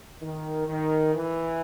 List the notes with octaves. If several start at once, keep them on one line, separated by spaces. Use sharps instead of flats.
D#3
D#3
E3